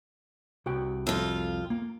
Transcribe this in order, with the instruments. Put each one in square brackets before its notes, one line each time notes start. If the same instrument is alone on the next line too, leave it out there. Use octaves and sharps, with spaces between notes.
[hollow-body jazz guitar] C2 F#4 G5
[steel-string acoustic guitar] F2 F4
[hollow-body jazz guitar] A#3